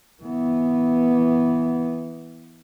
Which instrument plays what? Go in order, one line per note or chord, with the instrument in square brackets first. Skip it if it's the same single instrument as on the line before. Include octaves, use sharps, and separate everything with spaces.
[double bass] E3 B3